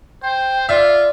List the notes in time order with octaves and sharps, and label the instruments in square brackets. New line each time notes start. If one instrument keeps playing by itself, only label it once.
[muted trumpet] C5 [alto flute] G5
[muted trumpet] F4 [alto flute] D5 [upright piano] E5